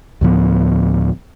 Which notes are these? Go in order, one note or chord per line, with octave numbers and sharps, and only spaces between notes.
D2 A2 F3 B3